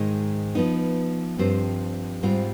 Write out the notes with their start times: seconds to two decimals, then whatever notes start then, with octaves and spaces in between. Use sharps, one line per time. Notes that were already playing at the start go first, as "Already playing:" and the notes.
Already playing: G#2 D#3 G#3
0.55 F3 B3 D#4
1.38 G2 F3 C4 G4 C5
2.23 G#2 G3 C4 F4 C5